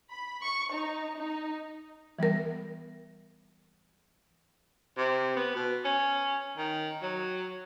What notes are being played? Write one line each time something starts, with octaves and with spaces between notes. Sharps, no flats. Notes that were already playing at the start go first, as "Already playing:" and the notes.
B5
C#6
D#4
D#4
E3 G3 B3 A#4
C3
B3
B2
C#4
D#3
F#3